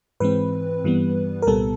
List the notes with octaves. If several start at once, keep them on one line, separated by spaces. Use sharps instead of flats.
G#2 E3 G#3 C4 B4
G2 E3 G3 B3
A#4
C2 A#2 G3 B3 A4